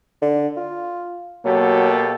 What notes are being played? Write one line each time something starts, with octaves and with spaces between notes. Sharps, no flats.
D3
F4
B2 F#3 A#3 G4 A4